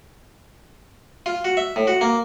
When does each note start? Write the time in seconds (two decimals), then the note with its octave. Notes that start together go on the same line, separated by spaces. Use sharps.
1.26 F4
1.45 F#4
1.57 E5
1.76 A2
1.87 F#4
2.01 A#3